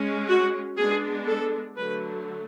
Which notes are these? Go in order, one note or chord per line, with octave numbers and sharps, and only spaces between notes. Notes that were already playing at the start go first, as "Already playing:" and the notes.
Already playing: G#3 C#4
F#4
G#3 B3 D4 G#4
A4
D3 F#3 A3 B4